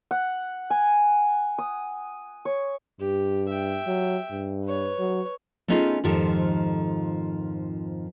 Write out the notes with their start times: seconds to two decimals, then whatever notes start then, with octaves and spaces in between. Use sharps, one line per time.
0.11 F#5
0.70 G#5
1.58 D#6
2.45 C#5
3.00 G2 G4
3.49 E5 G5
3.87 F#3
4.32 G2
4.64 B4 C#5
4.99 F#3
5.68 A3 B3 C#4 D#4 F4 G#4
6.04 F2 G#2 D#3 F3 G4 A4